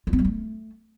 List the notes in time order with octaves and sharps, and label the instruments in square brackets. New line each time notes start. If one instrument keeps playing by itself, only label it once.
[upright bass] F4
C4
G3
A3